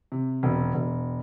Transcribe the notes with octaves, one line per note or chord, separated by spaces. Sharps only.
C3
E1
E1